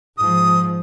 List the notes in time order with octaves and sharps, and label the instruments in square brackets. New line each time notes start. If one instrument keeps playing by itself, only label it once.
[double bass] G#2 F3 [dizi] D#6